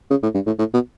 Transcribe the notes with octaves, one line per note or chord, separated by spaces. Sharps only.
C#3
A2
G2
A2
A2
B2